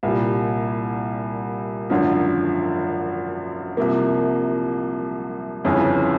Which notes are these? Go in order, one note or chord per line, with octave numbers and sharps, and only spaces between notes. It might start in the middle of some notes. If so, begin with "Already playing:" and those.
C2 A#2 G3
G#1 F#2 D3 F3
C2 C3 F3 A#3
G1 F2 C#3 E3